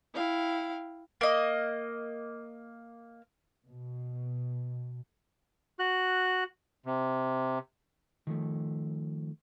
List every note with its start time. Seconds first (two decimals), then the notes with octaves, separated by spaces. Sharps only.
0.14 E4 F5 G5
1.21 A#3 D#5
3.67 B2
5.79 F#4 F#6
6.86 C3
8.27 D#3 F3 A3